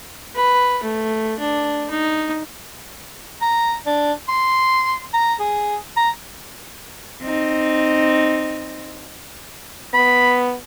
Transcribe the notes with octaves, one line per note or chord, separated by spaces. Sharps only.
B4
A3
D4
D#4
A#5
D4
C6
A#5
G#4
A#5
C4 D#4
B3 B5